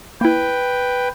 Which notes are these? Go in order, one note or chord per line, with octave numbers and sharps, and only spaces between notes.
A#3 E4 B4 G5